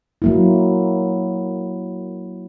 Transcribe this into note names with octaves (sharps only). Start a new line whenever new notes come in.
F#3 A#3 E4